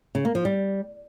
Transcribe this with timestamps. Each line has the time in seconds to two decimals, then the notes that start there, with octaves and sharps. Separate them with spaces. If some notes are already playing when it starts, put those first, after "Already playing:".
0.15 C#3
0.25 A#3
0.35 F3
0.45 G3